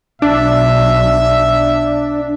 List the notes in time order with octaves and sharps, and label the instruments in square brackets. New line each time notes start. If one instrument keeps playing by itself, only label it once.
[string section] B1 [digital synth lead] D4 [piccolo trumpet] E5